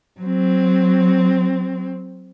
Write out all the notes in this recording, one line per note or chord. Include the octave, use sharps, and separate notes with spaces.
F#3 C4